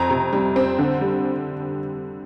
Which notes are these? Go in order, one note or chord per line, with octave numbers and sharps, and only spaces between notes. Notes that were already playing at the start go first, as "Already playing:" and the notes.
Already playing: F2 A#5
C3
G3
C4
D3
G3